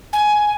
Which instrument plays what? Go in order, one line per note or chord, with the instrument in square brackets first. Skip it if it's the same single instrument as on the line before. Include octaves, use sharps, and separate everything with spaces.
[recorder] G#5